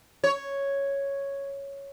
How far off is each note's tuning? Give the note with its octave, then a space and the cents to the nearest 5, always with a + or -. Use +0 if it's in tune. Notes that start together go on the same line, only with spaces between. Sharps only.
C#5 +0